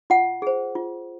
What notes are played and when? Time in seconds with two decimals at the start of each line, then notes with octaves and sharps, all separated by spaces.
0.10 F4 F#5
0.42 G#4 C5
0.75 F4